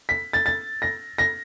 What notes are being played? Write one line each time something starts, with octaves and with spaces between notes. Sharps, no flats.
B6
A6
A6
A#6
A#6